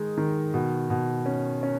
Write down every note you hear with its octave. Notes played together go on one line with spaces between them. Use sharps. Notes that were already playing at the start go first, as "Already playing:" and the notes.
Already playing: D#3 G#3 D#4
D#3
B2
B2
C#4
C#4